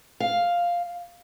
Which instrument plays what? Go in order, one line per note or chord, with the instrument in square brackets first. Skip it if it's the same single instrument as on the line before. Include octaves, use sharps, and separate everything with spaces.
[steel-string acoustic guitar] F5